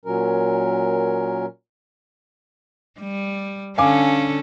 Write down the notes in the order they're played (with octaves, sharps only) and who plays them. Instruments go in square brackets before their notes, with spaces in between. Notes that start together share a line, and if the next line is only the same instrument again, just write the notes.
[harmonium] A#2 F#3 C#4 A#4
[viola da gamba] G3
[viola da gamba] D3 C#4 A4 [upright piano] F5 G#5 D6